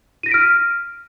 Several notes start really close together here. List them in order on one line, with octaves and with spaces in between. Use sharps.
D#7 A#6 B6 D7 F6